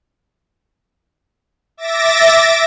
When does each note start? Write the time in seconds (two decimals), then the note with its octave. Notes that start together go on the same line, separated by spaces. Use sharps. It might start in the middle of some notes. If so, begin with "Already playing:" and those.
1.77 E5 D6 A6 A#6
2.32 D7